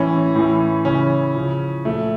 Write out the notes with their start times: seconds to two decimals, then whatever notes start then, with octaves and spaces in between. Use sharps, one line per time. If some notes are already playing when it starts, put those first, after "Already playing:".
Already playing: A2 E3 C#4
0.35 A2 E3
0.85 C#3 E3 C#4
1.35 C#3 F3
1.85 A#2 F3 A3